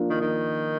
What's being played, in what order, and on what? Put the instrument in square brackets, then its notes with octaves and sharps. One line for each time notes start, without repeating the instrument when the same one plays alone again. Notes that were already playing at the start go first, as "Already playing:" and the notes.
Already playing: [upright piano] F3 A#3 D4 F4 A#4
[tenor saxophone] D#3
D#3